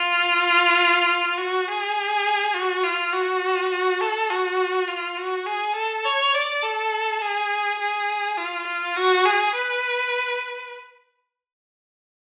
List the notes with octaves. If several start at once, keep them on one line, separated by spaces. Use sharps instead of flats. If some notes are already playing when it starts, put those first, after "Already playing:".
Already playing: F4
F#4
G#4
F#4
F4
F#4
F#4
A4
F#4
F4
F#4
G#4
A4
C#5
D5
A4
G#4
G#4
F4
F4
F#4
G#4
B4